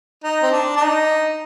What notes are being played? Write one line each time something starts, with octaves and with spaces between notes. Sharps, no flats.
D#4
C4
D4
D4
D#4